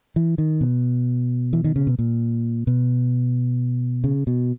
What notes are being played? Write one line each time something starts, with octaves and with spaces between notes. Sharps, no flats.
E3
D#3
B2
E3
D#3
C#3
B2
A#2
B2
C#3
B2